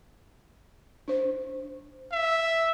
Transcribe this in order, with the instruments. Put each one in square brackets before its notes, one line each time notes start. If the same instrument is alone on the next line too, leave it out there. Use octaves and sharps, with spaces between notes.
[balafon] D4 C5
[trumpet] E5